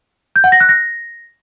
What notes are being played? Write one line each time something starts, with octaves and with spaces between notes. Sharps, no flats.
G6
F#5
A#6
F#6
A#6